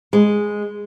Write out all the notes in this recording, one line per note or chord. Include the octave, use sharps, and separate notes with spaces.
G#3